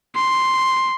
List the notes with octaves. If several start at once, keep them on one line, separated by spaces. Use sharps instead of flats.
C6